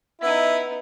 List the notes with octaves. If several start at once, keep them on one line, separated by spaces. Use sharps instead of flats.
B3 D#4 E4